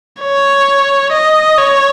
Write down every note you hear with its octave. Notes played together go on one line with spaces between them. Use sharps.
C#5
D#5
C#5